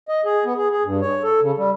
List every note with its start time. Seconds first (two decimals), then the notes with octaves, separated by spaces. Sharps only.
0.09 D#5
0.25 G#4
0.45 B3
0.57 G#4
0.72 G#4
0.84 G2
1.01 C#5
1.23 A4
1.41 C#3
1.57 G3